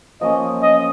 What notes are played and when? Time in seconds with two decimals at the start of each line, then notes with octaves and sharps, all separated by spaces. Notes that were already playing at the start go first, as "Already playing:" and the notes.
0.21 F3 A#3 C#4 D#5
0.62 D#5